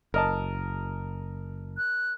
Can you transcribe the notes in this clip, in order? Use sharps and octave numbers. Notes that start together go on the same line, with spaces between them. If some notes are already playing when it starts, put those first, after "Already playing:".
F#1 A#4 D#5 A5
F#6